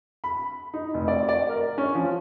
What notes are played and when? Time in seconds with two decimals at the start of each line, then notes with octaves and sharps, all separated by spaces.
0.24 B5
0.74 D#4
0.94 F1
1.08 D5
1.29 D5
1.49 A#4
1.78 C#4
1.95 F3